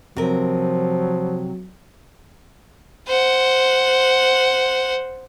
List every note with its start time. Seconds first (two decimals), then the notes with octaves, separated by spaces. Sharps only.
0.16 C3 F3 F#3 A#4
3.07 C5 F#5